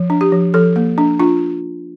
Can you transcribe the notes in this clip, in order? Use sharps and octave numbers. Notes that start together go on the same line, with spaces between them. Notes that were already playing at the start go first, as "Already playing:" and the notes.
Already playing: F3
D4
G4
F3
F3 A4
A#3
D4
D4 F4